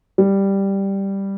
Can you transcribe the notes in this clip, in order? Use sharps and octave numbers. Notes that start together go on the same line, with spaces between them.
G3